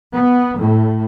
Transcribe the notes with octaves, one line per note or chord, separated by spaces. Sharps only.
B3
A2